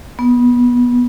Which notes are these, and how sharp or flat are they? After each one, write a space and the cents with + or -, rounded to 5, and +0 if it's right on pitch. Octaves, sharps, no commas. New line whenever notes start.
B3 -20